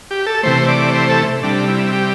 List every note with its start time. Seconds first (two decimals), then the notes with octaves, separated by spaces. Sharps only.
0.11 G4
0.26 A4
0.43 C3 E3 A3 C5
0.68 D5
0.93 C5
1.09 A4
1.43 C3 G3 D4
1.68 E4
1.93 G4